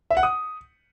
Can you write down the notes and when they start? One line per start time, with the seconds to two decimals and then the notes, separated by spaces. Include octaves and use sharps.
0.10 E5
0.17 F#5
0.23 D#6